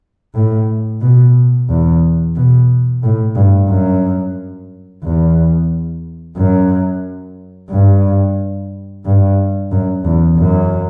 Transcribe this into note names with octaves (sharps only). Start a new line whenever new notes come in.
A2
B2
E2
B2
A2
G2
F#2
E2
F#2
G2
G2
F#2
E2
F#2